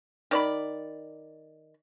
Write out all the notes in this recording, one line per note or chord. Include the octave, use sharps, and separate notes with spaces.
D#3 D5 B5